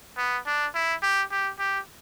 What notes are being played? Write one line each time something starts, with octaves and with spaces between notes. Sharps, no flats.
B3
D4
E4
G4
G4
G4